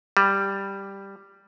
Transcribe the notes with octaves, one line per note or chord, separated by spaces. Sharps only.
G3